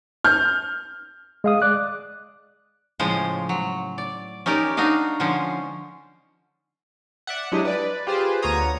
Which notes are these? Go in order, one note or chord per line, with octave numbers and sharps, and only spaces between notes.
F6 G6
G#3 F5 D#6
D5 D6 F#6
A2 C#3 F3 G#3 C5
F#3
D5
C#4 D#4 G4 A#4 D5
D4 D#4 F#4 D#5 F5
D3 F3 G#3 C#4 C5
D5 E5 F#5
F#3 G#3 D4 E4 G4 D#5
B4 D5
F4 G4 G#4 B4 C5
D2 B3 F4 C#5 A#5 D#6